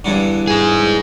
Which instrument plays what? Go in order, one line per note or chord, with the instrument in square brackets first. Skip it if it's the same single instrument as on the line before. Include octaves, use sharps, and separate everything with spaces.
[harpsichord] E2 G2 D3
[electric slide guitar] D#4 G#4